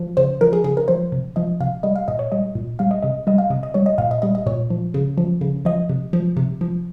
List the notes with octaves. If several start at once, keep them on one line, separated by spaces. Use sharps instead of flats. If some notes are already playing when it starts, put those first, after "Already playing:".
Already playing: F3
C#3 C5
F3 A#4
G#4
C#3 G#4
A#4
F3 C5
C3
F3 D#5
C3 F5
G3 D#5
F5
A#2 D#5
C#5
G3 D#5
A#2
G3 F5
D#5
C3 D#5
G3 D#5
F5
C3 D#5
D#5
G3 C#5
D#5
A#2 F5
D#5
G3 D#5
D#5
A#2 C#5
F3
C#3
F3
C#3
F3 D#5
C3
F3
C3
F3